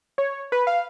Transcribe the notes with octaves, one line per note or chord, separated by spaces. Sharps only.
C#5
B4
F5